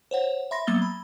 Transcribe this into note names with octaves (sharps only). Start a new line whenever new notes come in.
C5 C#5 F#5
E5 B5 C6 A#6
F#3 A#3 B3 E6 A6 G7
B5